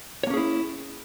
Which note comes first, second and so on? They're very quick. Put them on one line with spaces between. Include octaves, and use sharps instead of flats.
C#5 A#3 C#4 G#4 E4